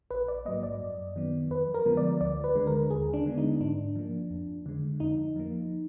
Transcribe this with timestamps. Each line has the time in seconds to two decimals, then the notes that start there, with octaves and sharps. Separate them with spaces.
0.11 A#1 B4
0.28 D5
0.45 G#2 F#3 A#3 D#5
0.63 D5
0.81 F#2
1.16 D#3 F#3 B3
1.50 F2 B4
1.74 A#4
1.85 D3 F3 G#3 B3
1.97 D5
2.21 D2 D5
2.44 B4
2.55 D3 G#3
2.67 A#4
2.90 D#2 G#4
3.13 D4
3.26 D3 G#3 B3
3.38 D#4
3.61 G#2 D4
3.96 F3 A#3
4.31 F2
4.66 D3 G#3
5.00 F2 D#4
5.36 F3 A#3